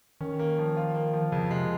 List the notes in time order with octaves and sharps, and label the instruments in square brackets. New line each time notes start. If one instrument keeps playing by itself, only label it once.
[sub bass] D#3 [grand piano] C#4
[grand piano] A#3
F3
F4
A#3
F3
[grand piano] F2 [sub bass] C#3
[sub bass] C3 [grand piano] G#3